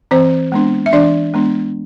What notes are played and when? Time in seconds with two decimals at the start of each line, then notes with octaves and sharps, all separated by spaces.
0.11 E3 C4 C5
0.52 G#3 B3 D4
0.86 E5
0.93 E3 D4 D5
1.34 G#3 B3 D4